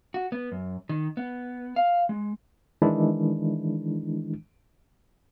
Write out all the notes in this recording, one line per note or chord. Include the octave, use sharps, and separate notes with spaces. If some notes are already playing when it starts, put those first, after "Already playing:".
F#4
B3
F#2
D#3
B3
F5
G#3
D#3 E3 G#3 D4 E4